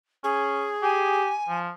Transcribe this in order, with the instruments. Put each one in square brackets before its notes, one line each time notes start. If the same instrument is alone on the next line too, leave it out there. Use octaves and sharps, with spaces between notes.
[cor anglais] C#4 [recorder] G#4
[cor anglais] G4 [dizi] G#5
[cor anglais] F3